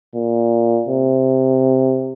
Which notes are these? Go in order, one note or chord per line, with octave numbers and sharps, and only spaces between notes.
A#2
C3